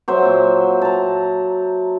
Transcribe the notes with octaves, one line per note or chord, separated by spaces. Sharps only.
F#3 C5 E5
A#2
A5 A#5